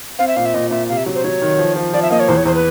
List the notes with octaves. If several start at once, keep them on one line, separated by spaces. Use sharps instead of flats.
C4 F5
E5
A#2 F5
E5
A#2 D#5
A#2 E5
C3 F5
E5
F#3
C5
F#3 C#5
D#3
F3
F3
F3 D5
E5
A#3 D#5
C#5
E2 C5
C#5
E2 C5
B4